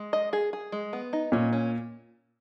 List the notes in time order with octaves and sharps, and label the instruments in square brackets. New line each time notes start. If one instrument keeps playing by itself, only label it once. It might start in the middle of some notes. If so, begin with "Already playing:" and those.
Already playing: [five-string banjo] G#3
D#5
G#4
G#4
G#3
B3
D#4
[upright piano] A#2 [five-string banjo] C#4
[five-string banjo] C#4